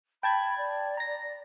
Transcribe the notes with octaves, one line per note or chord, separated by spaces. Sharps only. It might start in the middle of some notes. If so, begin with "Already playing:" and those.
G5 A5 B5 G#6
D5
A#5 A#6